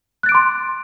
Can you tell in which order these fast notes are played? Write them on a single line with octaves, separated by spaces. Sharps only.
F#6 A6 D7 D6 C6